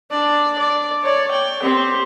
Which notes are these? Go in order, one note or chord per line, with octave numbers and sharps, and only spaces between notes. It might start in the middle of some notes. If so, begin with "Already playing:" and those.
D4 D5
D5
C#5 D5
G5
C4 G4